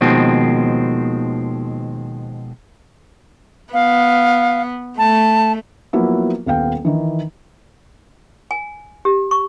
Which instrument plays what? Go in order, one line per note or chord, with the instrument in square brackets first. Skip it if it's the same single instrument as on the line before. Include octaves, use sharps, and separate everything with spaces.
[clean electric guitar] D#2 B2 D#3 F3 G#3 C4
[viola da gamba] B3 [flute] F5
[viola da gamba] A3 [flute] A5
[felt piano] F3 F#3 A#3 B3 E4 F#4
D#1 B3 F5 G5
D#3 E3
[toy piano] G#5
G4
C#6